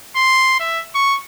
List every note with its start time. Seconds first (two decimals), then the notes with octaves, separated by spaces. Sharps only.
0.16 C6
0.60 E5
0.95 C#6